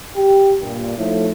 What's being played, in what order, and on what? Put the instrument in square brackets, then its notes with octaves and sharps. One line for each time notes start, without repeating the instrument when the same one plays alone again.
[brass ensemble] G4 G5
G2 A#2
F3 A3 D#4 E4 A4 C#5